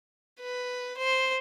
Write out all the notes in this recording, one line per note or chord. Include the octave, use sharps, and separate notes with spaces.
B4
C5